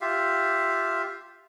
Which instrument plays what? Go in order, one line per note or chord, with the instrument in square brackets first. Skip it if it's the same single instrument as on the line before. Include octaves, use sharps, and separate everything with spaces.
[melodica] F4 G4 E5 F5